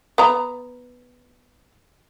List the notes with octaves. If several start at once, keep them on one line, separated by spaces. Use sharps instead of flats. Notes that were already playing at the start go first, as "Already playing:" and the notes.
B3 A#5